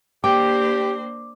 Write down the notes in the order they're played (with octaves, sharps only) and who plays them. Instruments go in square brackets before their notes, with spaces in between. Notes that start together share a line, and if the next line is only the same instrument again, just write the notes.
[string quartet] A#3 D4 C5 [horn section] G4 [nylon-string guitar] G5 [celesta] D6